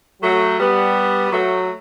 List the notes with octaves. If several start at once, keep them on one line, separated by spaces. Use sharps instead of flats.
F#3 A3
G3 B3
F#3 A3